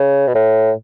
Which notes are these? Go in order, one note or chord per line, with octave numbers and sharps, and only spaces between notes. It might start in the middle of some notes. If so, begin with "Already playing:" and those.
Already playing: C#3
B2
A2